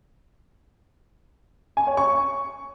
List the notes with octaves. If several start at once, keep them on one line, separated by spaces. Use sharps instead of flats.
G#5
C#5
C#6